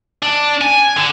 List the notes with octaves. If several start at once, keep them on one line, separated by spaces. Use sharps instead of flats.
D4
G#5
D3